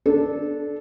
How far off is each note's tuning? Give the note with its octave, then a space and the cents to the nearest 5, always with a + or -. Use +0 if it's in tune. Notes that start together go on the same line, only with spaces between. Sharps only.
D4 +0 A4 -20